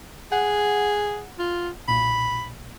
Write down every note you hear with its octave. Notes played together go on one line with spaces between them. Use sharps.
G#4 F#5
F4
B1 A#2 B5